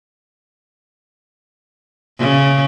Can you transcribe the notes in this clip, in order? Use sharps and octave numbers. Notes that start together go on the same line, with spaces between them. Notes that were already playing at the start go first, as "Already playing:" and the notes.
C#3